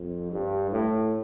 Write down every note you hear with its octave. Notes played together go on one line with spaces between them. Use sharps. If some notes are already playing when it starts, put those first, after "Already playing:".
Already playing: F2
G2
A2